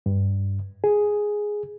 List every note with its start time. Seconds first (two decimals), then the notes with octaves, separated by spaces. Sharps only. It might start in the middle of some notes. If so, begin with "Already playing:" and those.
0.06 G2
0.84 G#4